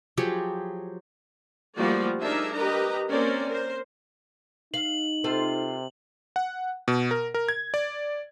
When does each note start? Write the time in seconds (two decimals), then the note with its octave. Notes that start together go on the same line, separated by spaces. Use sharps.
0.17 F3 F#3 G4 G#4
1.77 F3 G3 A3 A#3 F#4 D5
2.21 D4 D#4 G#4 A#4 D5 E5
2.55 G4 A#4 B4 D#5 A#5
3.10 A#3 C4 C#4 A#4 C5 D5
3.48 A#4 C5
4.74 D#4 F5 F#7
5.24 C3 F4 A4 C5
6.36 F#5
6.88 B2
7.11 A#4
7.34 A#4
7.49 G#6
7.74 D5